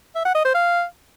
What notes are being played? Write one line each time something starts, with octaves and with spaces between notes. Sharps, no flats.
E5
F#5
D#5
C5
F5